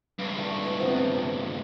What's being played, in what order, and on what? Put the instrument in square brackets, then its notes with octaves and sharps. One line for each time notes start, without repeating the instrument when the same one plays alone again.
[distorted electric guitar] C#2 G2
[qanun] A3
A4 B4
C3 F3 B3